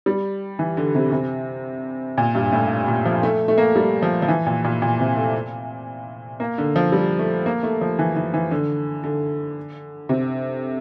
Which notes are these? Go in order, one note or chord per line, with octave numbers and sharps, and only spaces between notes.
G3
E3
D3
C3
C3
A#2
G2
A2
A#2
F3
A3
A3
A#3
G3
F3
F3
E3
A#2
A#2
A#2
C3
A3
A#3
D3
F3
G3
A3
A#3
A3
F3
E3
E3
E3
D3
D3
C3